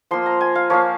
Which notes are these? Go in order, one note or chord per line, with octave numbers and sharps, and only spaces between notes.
F3 A#3 F4 C6
A#5
G#5
F5
F3 A#3 F4 C#5